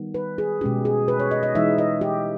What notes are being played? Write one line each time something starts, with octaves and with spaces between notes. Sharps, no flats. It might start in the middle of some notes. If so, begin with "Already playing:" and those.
Already playing: D#3 G3 B3
B4
G#4
B2 G#3 C#4 G4
G#4
B4
C#5
D#5
D#5
E3 G#3 D#4 E5
D#5
G4